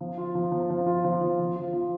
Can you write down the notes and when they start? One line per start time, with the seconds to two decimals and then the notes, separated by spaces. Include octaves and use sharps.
0.01 F3
0.18 F4
0.35 F3
0.52 F3
0.70 F3
0.86 F4
1.04 F3
1.21 F3
1.39 F3
1.56 F4
1.73 F3